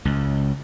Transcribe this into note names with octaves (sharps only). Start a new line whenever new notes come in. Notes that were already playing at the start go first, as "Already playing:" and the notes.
C#2